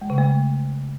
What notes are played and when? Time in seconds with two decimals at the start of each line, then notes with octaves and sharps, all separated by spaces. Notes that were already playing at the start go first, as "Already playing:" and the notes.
0.01 G#3
0.10 C#3
0.18 A3